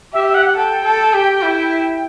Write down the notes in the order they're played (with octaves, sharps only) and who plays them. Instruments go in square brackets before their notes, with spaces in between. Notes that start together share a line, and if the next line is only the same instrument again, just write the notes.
[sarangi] G4 [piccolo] E5
[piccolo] E5
F#5
F#5
[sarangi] A4 [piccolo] G5
[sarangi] A4
G4
E4